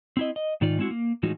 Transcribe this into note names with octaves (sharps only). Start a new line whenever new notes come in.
C4 E4 D#5
D#5
G#2 D#3 D#4 F4 D5
G#3 C4 E4 F#4
A#3
A2 E3 F3 G#3 D#4 F#4